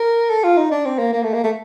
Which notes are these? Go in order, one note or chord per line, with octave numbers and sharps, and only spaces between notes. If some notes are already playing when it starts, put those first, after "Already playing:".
Already playing: A#4
A4
F4
D#4
D4
C4
A#3
A#3
A3
A#3
A3